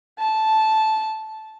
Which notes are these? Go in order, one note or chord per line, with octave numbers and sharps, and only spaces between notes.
A5